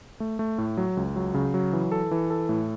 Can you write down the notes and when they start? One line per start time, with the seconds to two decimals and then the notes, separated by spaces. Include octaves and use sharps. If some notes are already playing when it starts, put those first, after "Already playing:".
0.20 A3
0.39 A3
0.58 A2
0.77 F#3
0.97 C#2
1.16 F#3
1.34 C#3
1.54 F#3
1.73 E3
1.92 A4
2.11 E3
2.30 A4
2.49 A2